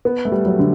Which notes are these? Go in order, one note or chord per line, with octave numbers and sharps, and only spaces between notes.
B3
A3
G3
F#3
D3